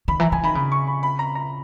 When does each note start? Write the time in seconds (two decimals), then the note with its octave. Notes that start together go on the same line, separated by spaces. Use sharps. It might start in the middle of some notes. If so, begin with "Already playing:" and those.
0.08 D#3 B5
0.20 E3 A#5
0.32 E3 G#5
0.43 D#3 B5
0.55 C#3 B5
0.72 C#6
0.87 B5
1.03 B5
1.19 A#5
1.35 A#5